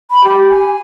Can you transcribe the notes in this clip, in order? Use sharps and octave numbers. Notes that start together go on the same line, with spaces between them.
B5
G4
G#5